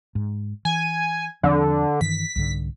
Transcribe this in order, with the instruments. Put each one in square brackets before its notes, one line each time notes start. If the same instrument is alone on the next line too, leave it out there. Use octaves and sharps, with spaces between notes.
[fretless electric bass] G#2
[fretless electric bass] E3 [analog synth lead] G#5
[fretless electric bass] E2 F3 C4 [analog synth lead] D3
[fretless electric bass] G2 D#3 E3 [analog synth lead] B6
[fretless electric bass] C2 G#2 D3